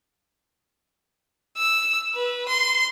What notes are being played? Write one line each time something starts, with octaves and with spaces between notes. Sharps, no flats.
E6
B4
C6